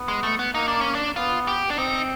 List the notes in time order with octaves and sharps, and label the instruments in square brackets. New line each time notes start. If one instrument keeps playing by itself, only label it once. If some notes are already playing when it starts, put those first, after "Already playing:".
Already playing: [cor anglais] B3
[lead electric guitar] G#3
A3
B3
[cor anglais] A#3 [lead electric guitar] D#4
[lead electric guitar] D4
C#4
D4
[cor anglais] B3 [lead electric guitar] F4
[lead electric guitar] G4
D4
[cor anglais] C4 [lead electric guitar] D#4